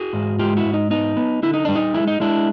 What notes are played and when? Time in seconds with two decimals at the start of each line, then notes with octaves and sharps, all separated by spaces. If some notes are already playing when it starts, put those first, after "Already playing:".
Already playing: F#4 G#4
0.13 G#2
0.39 G#3 F4 G4
0.57 E4 F#4
0.65 G#2
0.74 D#4
0.90 B3 D#4
1.17 B3
1.43 D3 E4
1.54 D#4
1.65 G3 D4
1.75 D#4
1.94 G#3 E4
2.07 D#4
2.20 G#3 D4 E4